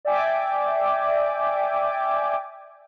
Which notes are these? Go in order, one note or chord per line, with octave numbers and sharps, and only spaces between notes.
D5 E5 G5 G#5 D6